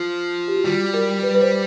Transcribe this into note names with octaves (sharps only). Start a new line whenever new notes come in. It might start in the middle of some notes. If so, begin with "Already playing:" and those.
Already playing: F3
G4
F#4
G3 F4
A#4
B4
B4
C5